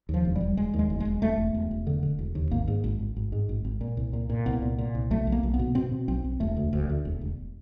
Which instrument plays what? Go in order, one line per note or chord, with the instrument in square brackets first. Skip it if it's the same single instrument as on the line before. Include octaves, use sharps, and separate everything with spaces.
[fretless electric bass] D#2
F3
E1
G3
E1
E1 G#3
D#2
G#3
E1
E1 G#3
E1 A3
E1
E1
E1
D3
D3
E1
D#2
G#1 A#3
G#2
G#1
G#1
G#1
G#2
G#1
G#1
A#2
C2
A#2
A#2
C2 B3
A#2
A#2
C2
B1 A3
B1
A#3
B1
B3
B2
B2 C4
B2
B1 C4
B1
E1 A3
D2
D2
D2
E1
E1